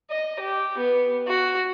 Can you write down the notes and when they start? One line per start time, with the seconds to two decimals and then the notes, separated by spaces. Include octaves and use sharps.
0.10 D#5
0.39 G4
0.78 B3
1.27 F#4